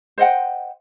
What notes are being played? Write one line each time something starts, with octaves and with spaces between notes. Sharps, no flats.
C5 D#5 F#5 G5